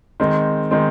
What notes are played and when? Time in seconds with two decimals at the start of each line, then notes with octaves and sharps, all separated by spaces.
0.20 D#3 G#3 C4
0.71 D#3 G#3 C4